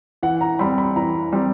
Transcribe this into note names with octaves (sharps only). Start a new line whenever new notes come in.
E3 F#5
A#5
G3 C4 B5
B5
E3 A#5
G3 C4